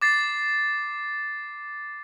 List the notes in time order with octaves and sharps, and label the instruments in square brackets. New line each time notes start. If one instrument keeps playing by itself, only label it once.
[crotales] D6 A6 C7